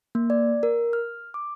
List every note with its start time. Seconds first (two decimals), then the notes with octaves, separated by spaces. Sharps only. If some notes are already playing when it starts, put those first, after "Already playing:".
0.15 A#3
0.30 D5
0.63 A#4
0.93 F6
1.34 D6